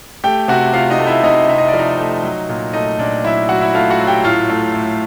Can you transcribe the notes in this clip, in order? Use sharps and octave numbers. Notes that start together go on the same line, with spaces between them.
A3 G4 G5
C3 F#4 F#5
C3 F4 F5
D#4 D#5
A3
E4 E5
C3 D#4 D#5
C3 E5
D#5
D5
F3
D#4 D#5
A3
F#3
A#2
A3 D#4 D#5
A#2 D4 D5
F#3 E4 E5
F#3 F#4 F#5
E4 E5
A3 F4 F5
F#4 F#5
F#3
G4 G5
A2 F4 F5
A3
A2